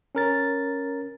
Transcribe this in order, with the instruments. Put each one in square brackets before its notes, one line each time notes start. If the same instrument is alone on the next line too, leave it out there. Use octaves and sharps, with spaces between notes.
[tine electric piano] C#4 A#4 A6